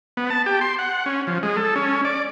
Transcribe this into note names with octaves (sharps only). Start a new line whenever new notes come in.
B3
A5
G4
C6
F#5
C#4
F3
G#3
A4
C#4
D5